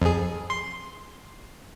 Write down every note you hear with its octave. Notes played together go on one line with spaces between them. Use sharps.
F2 G#4
C6